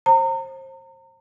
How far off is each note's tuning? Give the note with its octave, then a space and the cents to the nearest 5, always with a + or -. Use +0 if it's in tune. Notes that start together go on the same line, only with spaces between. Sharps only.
C5 +30 A#5 -35